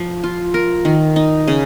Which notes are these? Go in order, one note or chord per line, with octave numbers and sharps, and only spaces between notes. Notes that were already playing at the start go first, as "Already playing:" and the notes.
Already playing: F3
F4
A#4
D#3
D#4
C#3